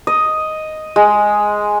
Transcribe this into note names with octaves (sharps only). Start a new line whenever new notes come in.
D#5
G#3